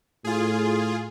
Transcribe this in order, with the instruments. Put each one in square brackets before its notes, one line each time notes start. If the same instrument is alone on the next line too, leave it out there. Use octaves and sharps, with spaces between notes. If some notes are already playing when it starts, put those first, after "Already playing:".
[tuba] A2 [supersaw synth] F4 G#4